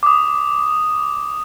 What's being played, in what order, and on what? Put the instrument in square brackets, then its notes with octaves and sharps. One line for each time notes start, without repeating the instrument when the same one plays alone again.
[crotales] D6 D#6